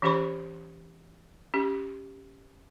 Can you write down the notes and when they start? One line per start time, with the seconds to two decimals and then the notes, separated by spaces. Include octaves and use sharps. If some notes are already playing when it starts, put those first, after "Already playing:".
0.02 E3 C#4 G4 C5 B5 C#6
1.54 C#4 G4